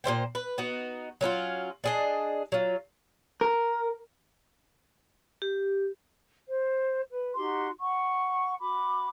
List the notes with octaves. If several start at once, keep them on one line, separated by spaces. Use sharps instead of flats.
A#2 A3 C5 G5
B4
B3 D#4 F#4
F#3 C#4 D#4 F4
D4 G#4 D#5
F#3 F4
A#4
G4
C5
B4
D#4 F#4 G4 C6
F#5 C#6
F#4 B5 D6